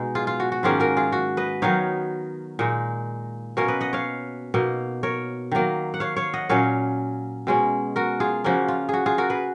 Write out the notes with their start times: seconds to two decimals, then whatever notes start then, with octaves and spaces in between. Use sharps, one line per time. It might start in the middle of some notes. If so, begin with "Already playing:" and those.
Already playing: B2 G#3 D#4
0.15 F4 G#4
0.27 F4
0.40 F#4
0.52 F#4
0.63 G#2 D#3 A#3 C#4 F4 G#4
0.80 F#4 A#4
0.97 F4 G#4
1.12 F#4
1.37 B4 D#5
1.62 D#3 F#3 B3 D#4 C#5 F5
2.59 A#2 G#3 D#4
3.57 B2 A#3 C#4 A#4 C#5
3.68 B4 D#5
3.81 D#5 F#5
3.93 C#5 F5
4.54 B2 A#3 D#4
5.03 A#4 C#5
5.52 D#3 F#3 A#3
5.94 F#5
6.00 C#5 F5
6.16 C#5 F5
6.34 D#5 F#5
6.49 A#2 F#3 C#4 C#5 F5
7.47 B2 G#3 C#4
7.96 F#4 A#4
8.20 F4 G#4
8.44 C#3 F3 A#3 C#4 F#4
8.68 F4
8.89 F#4 G#4
9.06 F4 G#4
9.18 F#4 A#4
9.30 G#4 B4